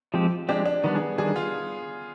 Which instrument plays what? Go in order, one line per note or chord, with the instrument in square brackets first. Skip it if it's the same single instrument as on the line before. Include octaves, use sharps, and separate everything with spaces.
[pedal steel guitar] F3 G#3 C4 G4
[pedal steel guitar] F3 G#3 C4 G4 [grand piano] D4
[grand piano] D4
[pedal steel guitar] D#3 G3 D4 [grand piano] B3
[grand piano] G#4
[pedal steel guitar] D#3 G3 D4 [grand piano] G#4
[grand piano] F4